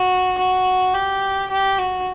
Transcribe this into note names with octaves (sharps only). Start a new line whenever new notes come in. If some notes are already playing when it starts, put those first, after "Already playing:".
Already playing: F#4
F#4
G4
G4
F#4